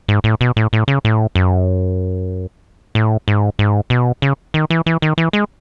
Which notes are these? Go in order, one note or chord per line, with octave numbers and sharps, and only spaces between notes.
G#2
A2
B2
A2
A2
C#3
A2
F#2
A2
G#2
G#2
B2
C#3
D#3
E3
E3
D#3
E3
G#3